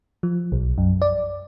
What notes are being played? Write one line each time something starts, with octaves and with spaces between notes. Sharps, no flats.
F3
B1
F#2
D5